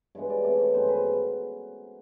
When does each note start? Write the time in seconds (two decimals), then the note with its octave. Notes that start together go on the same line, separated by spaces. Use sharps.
0.15 G2 E3 G#3 B3 C#5
0.30 D5
0.44 C3 E3 A3 D5
0.59 C#5
0.74 F#2 D#3 G#3 B3 C5
0.89 B4